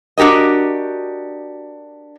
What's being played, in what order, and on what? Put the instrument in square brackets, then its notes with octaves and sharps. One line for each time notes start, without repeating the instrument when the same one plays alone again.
[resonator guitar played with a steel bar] D4 F#4 G4 A#4 D#5